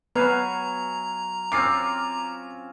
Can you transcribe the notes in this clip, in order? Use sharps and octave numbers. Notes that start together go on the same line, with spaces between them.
F#3 B3 B4 F5 G#5 A#5
C4 C#4 F4 D6 C7